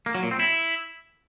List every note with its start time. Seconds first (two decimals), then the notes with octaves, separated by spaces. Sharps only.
0.06 A#3
0.15 F#3
0.23 A#2
0.31 C4
0.39 E4